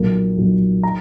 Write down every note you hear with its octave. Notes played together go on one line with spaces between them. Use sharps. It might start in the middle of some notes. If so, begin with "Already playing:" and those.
Already playing: B1 A#2 F#3 A#3
B1 A#2 F#3 A#3
A#5